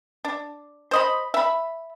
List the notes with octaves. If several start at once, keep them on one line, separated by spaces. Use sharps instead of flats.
D4
C5 D#5 B5
E5 B5